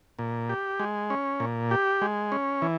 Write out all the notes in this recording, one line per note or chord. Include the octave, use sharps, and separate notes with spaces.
A#2
G4
G#3
C#4
A#2
G4
G#3
C#4
E3